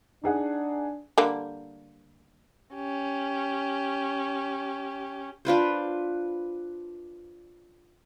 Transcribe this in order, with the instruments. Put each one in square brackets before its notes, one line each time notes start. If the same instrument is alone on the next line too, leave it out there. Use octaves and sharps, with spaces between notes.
[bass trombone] D4 [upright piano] D#4 G#4 F#5
[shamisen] D3 G3 A#3
[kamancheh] C#4 G4
[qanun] D4 F4 B4 C5